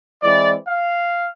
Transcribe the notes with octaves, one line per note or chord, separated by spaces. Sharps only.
E3 G#3 C4 E4 D5
F5